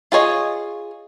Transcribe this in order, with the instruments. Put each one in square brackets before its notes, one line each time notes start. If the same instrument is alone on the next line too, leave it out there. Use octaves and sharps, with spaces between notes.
[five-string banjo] F4 G#4 C#5 D#5